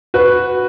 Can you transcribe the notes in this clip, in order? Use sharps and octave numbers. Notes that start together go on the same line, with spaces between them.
F#4 B4